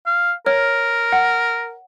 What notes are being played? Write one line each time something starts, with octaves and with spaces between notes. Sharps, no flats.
F5
A#4 C#5 F6
F#5